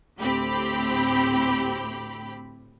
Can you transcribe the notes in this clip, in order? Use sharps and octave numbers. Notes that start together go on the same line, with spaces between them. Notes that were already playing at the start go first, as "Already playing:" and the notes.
D2 A2 C4 G4 B5